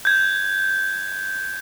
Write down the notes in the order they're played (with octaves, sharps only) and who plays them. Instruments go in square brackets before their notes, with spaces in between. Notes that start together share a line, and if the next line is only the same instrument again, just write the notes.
[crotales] G6 G#6